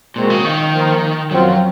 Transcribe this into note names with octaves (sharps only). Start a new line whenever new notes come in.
A#2 G#3 C4 F#4 A#4
C#3
D#3
F3 A#3 F4 A#4
F#2 F3 F#3 C4 F4